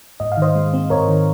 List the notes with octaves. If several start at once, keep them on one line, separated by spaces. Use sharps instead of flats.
G#2 D#5
F5
D#3 C5 D#5
G#3
C4
G#2 A#4 C#5
D#3